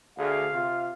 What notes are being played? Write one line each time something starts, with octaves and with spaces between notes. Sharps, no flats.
D2 G#4 F5
C3 F4